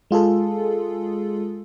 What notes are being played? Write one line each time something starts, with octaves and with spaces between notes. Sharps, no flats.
G#3 F4 G#4 A4